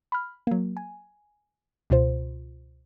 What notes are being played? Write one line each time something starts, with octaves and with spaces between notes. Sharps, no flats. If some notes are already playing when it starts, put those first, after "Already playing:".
B5 F6
F#3 A#3
G#5
C#2 B2 F4 C5